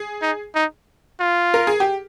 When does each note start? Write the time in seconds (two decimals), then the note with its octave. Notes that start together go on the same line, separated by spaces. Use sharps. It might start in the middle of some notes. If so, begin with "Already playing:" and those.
Already playing: G#4
0.22 D#4
0.55 D#4
1.20 F4
1.54 A#4
1.67 G#4
1.80 G4